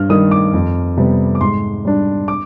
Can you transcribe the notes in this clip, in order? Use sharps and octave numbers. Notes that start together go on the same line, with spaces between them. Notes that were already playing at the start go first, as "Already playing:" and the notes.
Already playing: G2 F6
D#3 G3 D#6
D6
F2
C3 G3 B3
D6
G#2 C6
G3 D4
D6